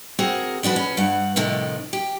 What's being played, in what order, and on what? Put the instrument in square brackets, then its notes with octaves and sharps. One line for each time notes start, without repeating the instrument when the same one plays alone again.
[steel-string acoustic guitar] C4 F#4 G#4 A#4
F3 D4 F#4 B4
C#4
G2 F#5
F2 A2 C3 D#3
G4